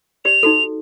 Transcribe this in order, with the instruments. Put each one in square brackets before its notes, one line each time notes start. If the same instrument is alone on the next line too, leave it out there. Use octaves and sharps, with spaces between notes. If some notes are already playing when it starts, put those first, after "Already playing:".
[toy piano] G4 D5 [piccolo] F7
[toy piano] D#4 F#4 A4